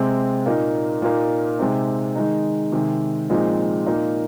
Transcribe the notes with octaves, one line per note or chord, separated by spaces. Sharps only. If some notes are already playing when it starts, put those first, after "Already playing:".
Already playing: C3 G#3 C4
A#2 A#3 D#4
A#2 A#3 D#4
C3 G#3 C4 D#4
D#3 G#3 D#4
C3 D#3 G#3
A#2 F3 G#3 C4 D#4
A#2 A#3 D#4